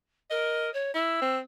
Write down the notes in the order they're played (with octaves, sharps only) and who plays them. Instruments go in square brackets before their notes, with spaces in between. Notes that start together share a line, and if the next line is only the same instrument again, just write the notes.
[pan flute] A#4 [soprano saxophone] D#5
[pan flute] C#5
[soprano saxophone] E4 [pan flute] E6
[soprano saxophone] C4